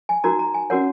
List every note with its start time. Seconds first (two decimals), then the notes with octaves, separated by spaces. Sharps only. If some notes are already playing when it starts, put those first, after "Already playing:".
0.09 G#5
0.24 D#4 F#4 A#4 A#5
0.39 A#5
0.54 G#5
0.70 C#4 F#4 A#4 C#5 F#5